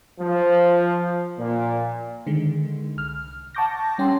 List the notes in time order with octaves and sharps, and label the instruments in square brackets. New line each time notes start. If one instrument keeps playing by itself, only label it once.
[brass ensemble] F3
A#2
[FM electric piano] D3 D#3 G#3
C2 F6
F#5 A5 C#6 D6 G6 A#6
G3 C#4 G5 G#5 C6